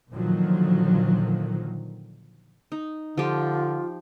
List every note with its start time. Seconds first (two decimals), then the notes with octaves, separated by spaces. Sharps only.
0.10 A#2 D3 D#3 F3 F#3
2.72 D#4
3.17 D3 F3 F4 G4